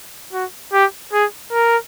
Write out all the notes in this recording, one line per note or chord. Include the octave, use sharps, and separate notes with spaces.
F#4
G4
G#4
A#4